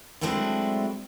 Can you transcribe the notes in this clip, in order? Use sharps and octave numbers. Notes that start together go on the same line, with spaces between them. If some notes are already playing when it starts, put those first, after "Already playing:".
F#3 G#3 A3 C4 D4 E4